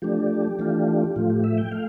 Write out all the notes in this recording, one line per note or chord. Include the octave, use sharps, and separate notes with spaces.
F3 A3 D4 G4
E3 A3 D4 F4
A2 F3 A3 F4
G4
E5
G5
A3 F5